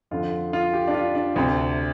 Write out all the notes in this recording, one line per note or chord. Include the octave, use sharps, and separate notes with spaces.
F2 D3 F4
F4
G4
D4
F4
D4
D2 C3